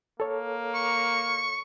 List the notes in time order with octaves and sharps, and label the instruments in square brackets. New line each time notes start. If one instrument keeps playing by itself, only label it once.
[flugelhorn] A#3 [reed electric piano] A4 C#5
[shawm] C#6